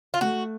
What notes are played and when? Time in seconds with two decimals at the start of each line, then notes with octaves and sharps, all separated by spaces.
0.14 F4
0.21 A3 F#4